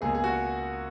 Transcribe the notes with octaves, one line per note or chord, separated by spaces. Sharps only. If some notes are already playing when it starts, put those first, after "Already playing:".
C#2 B2 A#3 G#4
G#4
F#4